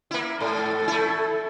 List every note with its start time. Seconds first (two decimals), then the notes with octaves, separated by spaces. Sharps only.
0.11 A#3 E4
0.40 G#2 A4
0.88 A3 E4